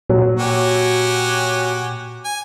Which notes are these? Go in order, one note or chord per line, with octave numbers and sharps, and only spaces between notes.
A#2 F#3
F#4 G4 G#5
G#5